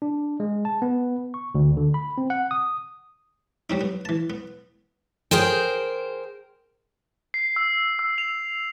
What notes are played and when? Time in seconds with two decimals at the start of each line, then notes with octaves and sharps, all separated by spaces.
0.02 D4
0.40 G#3
0.65 A5
0.82 B3
1.34 C#6
1.55 D2
1.77 D3
1.94 B5
2.18 C4
2.30 F#5
2.51 D#6
3.70 F#3 G3 C4 D#4
3.81 B3
4.05 E3 A5
4.30 B3
5.31 G#4 A#4 C5 G5
7.34 C7
7.56 E6
7.99 E6
8.18 F7